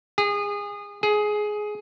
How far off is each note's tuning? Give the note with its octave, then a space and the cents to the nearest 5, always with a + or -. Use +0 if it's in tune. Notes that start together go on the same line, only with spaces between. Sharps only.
G#4 -25
G#4 +15